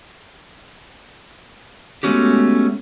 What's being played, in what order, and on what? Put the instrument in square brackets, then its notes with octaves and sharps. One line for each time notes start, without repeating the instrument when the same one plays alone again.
[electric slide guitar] G#3 A3 B3 C#4 F#4 G4